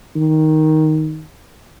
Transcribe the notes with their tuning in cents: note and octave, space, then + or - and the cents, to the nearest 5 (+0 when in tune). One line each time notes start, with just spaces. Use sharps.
D#3 +5